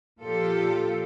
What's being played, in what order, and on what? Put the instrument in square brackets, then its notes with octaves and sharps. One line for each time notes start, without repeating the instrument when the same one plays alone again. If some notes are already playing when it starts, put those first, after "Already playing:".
[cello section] A#2 F3 F4 G4 A4